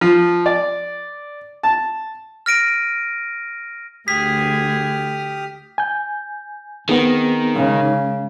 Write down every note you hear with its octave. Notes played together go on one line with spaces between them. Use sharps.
F3
D5
A5
F6 A#6 D7 D#7
D2 G4 G#4 D#6 F6 B6
G#5 G6
D#3 B3 C4 G#4
C#3 G#3 C#4